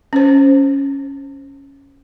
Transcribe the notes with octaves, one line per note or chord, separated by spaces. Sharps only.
C#4 C5